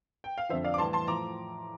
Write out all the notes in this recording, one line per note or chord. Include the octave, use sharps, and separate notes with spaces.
G5
F5
F2 D3 F3 C5 E5
D5 F5
D6
A2 E3 G3 A5 C6
A5 C6
A2 F3 A#5 D6